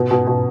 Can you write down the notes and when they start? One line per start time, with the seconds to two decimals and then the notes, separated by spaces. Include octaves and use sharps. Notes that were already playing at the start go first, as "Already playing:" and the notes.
Already playing: B2
0.11 B2
0.27 B2